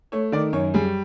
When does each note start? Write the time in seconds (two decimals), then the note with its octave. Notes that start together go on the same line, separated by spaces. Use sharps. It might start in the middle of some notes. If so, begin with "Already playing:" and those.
0.12 A3 C#5
0.32 D#3 D5
0.53 F#2 C#5
0.74 G3 G#4